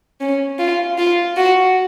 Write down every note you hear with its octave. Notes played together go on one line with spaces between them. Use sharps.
C#4
F4
F4
F#4